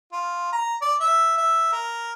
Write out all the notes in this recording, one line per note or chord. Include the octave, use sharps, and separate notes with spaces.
F4
A#5
D5
E5
E5
A#4